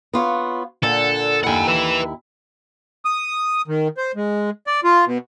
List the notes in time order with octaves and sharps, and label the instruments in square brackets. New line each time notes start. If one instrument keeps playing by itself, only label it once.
[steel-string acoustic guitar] B3 F4 C#5
[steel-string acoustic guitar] A#2 D3 F#5 [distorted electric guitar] A4
[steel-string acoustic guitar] D#2 E4 [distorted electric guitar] F#5 G#5
[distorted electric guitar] B4 E5
[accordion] D#6
D#3
C5
G#3
D5
F4
B2